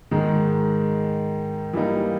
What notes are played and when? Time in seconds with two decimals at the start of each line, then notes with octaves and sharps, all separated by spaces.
0.11 G#2 D#3 G#3
1.73 E3 G3 A#3 D#4